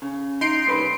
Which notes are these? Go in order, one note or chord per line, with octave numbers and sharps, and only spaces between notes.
C#3
D#4 C6 C7 D7
C2 B4